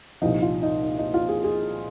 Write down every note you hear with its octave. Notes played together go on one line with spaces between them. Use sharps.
C2 A#2 F3 D#4
F4
D#4
D#4
D#4
F4
G#4
G#4